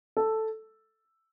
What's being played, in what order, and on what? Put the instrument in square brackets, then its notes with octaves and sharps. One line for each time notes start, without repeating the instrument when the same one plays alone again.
[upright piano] A4